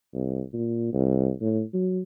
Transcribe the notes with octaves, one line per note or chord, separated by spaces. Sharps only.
C2
A#2
C2
A2
F#3